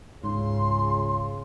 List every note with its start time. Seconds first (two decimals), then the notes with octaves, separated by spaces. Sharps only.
0.24 C#2 G#2 C#3 C6